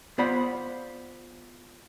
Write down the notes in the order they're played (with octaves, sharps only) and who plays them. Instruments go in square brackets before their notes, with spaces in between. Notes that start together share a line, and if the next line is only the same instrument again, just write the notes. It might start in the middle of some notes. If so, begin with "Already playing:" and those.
[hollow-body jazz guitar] B3 F4 C5 D5 F#5 B5